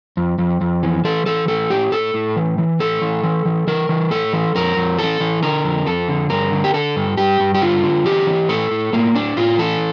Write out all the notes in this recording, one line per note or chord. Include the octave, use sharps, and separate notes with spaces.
F2
F2
F2
E3
E3 A4
E3 A4
A2 A4
A2 G4
A2 A4
A2
E3
E3
A2 A4
E3
E3
E3
E3 A#4
E3
A2 A4
E3
F2 A#4
F2
E3 A4
E3
D3 A#4
F2
F2 A4
D3
G2 A#4
D3
G4
D3 A4
G2
G2 G4
G2
G4
D3 F4
D3
E3 G4
E3
A2 A4
A2
A2 A#3
A2 D4
A2 F4
E3 A4